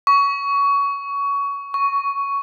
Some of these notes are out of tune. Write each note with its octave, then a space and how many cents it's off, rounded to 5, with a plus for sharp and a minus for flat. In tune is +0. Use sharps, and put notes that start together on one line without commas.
C#6 +20
C#6 +10